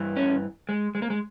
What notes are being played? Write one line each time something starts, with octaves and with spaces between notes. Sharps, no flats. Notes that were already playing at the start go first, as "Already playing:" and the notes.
Already playing: G2 E3
C#4
G#3
G#3
A#3
G#3